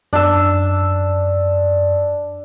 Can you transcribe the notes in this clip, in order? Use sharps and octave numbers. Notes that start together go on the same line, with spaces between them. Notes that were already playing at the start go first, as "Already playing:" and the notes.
F#2 D4 E6